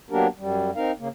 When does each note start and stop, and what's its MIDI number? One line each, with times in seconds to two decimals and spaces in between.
0.11 0.27 54
0.11 0.27 58
0.11 0.27 59
0.11 0.27 62
0.11 0.27 67
0.11 0.27 70
0.38 0.71 42
0.38 0.71 55
0.76 0.91 60
0.76 0.91 63
0.76 0.91 70
0.76 0.91 77
0.99 1.09 49
0.99 1.09 58